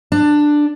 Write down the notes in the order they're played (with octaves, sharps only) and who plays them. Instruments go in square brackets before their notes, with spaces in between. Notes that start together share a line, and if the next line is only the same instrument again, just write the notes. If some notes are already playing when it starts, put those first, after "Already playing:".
[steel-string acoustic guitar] D4